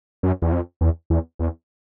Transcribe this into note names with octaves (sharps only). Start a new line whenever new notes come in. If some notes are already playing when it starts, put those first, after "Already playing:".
F#2
E2
F2
E2
E2
E2